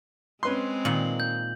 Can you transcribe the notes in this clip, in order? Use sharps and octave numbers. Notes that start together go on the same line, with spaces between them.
G#3 C4 C#4 B4 C6
A#2 D#3 F#7
G6